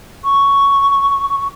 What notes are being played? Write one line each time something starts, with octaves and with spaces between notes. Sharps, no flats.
C#6